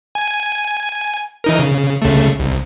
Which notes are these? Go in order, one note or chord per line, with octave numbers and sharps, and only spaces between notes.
G#5
E3 D#4 A#4
C#3
C#2 C#3 A3
C2